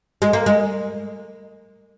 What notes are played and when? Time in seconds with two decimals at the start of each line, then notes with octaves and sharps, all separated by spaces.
0.22 G#3
0.33 A#3
0.46 G#3